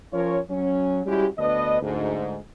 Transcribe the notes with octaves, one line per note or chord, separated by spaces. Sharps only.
F3 C#4 F4 A#4 C#5
F#3 C#4
G3 G#3 C#4 E4 F#4 G4
D2 B3 D4 B4 D#5
D2 G#2